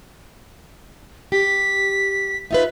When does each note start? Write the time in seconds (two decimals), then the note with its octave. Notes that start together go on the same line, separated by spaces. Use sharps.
1.32 G4 B6
2.51 D#4 F4 B4 E5